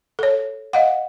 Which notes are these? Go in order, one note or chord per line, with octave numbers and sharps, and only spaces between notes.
A4 C#5
D#5 F5 F#5